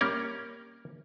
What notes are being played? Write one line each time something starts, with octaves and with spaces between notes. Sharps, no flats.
G3 A#3 C#4 A#4